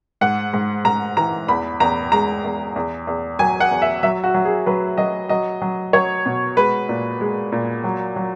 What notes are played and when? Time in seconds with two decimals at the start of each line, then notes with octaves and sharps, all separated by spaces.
0.21 G#2 F#5
0.53 G#2
0.85 G#2 A#5
1.17 E3 A#5
1.48 E2 B5
1.80 E2 A#5
2.12 G#3 A#5
2.44 E2
2.76 E2
3.07 E2
3.39 F#3 G#5
3.60 F#5
3.71 E2
3.82 E5
4.03 F#3 E5
4.24 F#4
4.34 F#3
4.45 G#4
4.66 F#3 B4
4.98 F#3 D#5
5.29 F#3 D#5
5.61 F#3
5.93 F#3 C#5
6.26 B2
6.57 G#3 B4
6.89 A#2
7.21 G#3
7.52 A#2
7.84 F#3
8.16 F#3